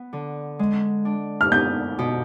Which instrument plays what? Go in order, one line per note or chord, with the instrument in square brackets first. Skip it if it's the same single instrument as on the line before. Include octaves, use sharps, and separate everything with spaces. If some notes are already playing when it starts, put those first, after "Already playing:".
Already playing: [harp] B3
D3
G#3
D4
[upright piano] F6
[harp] B3 [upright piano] G6
[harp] B2